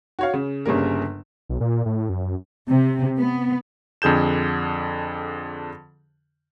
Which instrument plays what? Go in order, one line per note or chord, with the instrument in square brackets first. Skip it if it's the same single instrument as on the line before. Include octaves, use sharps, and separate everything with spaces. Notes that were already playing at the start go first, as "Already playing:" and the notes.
[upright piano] F#4 C#5 F5
C#3
G1 C#3 G3 A#3 A#4
[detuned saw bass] B1
A#2
A2
F#2
[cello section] C3
B3
[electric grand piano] F2 D3 G#4 G6 E7